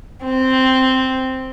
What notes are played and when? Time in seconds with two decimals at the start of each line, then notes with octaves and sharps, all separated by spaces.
0.24 C4